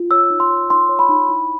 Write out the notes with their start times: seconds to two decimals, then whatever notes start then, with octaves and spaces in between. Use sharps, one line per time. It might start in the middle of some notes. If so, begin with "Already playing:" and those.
Already playing: F4
0.11 C#5 E6
0.30 D#4
0.40 C6
0.50 C#5
0.70 D#4 C6
0.89 C#5
0.99 B5
1.09 D#4
1.29 E4